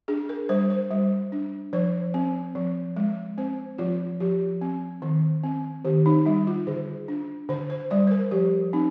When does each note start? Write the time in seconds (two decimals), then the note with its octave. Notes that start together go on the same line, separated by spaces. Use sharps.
0.08 D4 G#4
0.29 A#4
0.49 G3 C5
0.70 C5
0.91 G3
1.32 D4
1.73 F3 C5
2.14 C4
2.55 F3
2.97 G#3
3.38 C4 C5
3.78 F3 F4
4.20 F3 G4
4.61 C4
5.02 D#3
5.43 C4
5.85 D#3 G4
6.06 D#4
6.25 G3 D#4
6.47 F4
6.67 D3 G#4
7.08 D4
7.49 D3 C5
7.70 C5
7.91 G3 D5
8.07 C5
8.11 A#4
8.31 F3 G4
8.73 C4 D#4